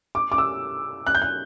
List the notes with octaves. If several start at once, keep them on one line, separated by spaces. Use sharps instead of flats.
D6
D6
E6
F#6
G6
F#6